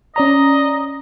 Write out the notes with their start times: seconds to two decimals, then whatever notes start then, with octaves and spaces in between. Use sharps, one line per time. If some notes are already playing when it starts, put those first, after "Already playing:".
0.16 C#4 D5 D#5 A#5